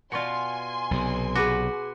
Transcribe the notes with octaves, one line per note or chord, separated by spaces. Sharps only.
B2 F4 D5 G#5 C6 C#6 C#7
B1 C3
F#4 G#4 B4 D6